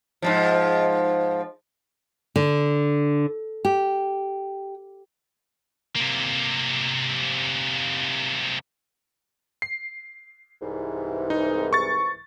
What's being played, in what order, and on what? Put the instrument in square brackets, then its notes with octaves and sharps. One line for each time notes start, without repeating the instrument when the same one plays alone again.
[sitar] G#2 B2 F3
[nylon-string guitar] D3
G4
[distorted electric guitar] C3 A#3
[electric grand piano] C7
[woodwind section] C2 G#2 E3
[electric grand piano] D#4
C#6 A6